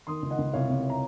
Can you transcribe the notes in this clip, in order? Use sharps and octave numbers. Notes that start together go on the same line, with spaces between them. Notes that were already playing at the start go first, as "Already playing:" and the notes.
D#3 C6 D#6
C#2
D#5 F#5
C#2
C2 C#5 F5
C3
A#5